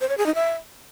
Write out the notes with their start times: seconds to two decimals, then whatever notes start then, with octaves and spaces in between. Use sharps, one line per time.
0.01 C5
0.09 C#5
0.18 G#4
0.26 D#4
0.35 E5